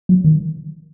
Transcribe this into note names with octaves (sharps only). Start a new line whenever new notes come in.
F#3
D#3